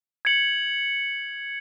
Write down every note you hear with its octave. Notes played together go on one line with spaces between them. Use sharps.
G#6 C#7 F#7